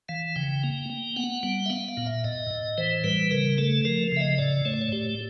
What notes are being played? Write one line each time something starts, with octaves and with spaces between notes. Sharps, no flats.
E3 F5
C#3 G5
A#3
A#3
B3 F#5
G3
E5
B3 F5
F5
A#2
E5
A2 D#5
A2
E3 C5
G3 B4
C#3 A#4
A3 A4
F3 A#4
C#3 E5
D#5
A2 D5
A3 C#5
D5
C#5
A2 G4